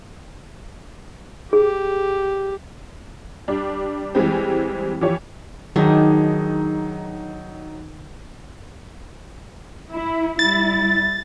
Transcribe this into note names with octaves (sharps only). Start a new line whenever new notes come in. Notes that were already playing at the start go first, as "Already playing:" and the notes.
G4 G#4
G3 D4
E3 G3 G#3 C4
E3 F3 G4 C#5
D#3 F#3 D4 D#4 G#4
E4
G3 E4 A6